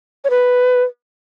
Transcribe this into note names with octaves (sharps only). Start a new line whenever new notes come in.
C#5
B4